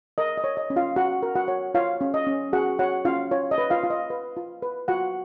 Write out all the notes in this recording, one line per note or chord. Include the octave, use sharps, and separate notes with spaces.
A#4 D#5
D#5
C#5
D#5
C#4
F4 F5
F#4 F#5
A#4
F#4 F#5
C#5
F4 C#5 F5
C#4
D#5
C#4
F#4 G#4 F#5
F#4 C#5 F#5
C#4 F4 F5
F4 C#5
D#5
B4
F4 F5
F4
D#5
B4
F4
B4
F4 F#4 F#5